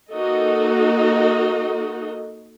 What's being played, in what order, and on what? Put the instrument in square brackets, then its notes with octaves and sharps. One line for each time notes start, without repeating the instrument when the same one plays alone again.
[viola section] A#3 D#4 F#4 A4 D#5